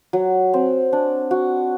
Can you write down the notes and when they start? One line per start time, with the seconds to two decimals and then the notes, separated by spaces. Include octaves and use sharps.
0.13 F#3
0.54 C4
0.93 D4
1.31 F#4